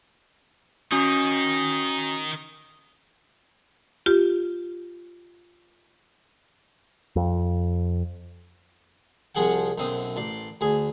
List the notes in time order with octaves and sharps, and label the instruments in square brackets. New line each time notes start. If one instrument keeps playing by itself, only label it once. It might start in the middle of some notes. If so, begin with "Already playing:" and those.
[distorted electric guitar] D#3 D#4 [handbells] C#4 F#4 D#6
[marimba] F4 G4
[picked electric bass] F2
[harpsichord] C2 F3 G#4 F#5 G5
B1 F#2 C4 G5 D#6
A1 D5 C6
D2 G#4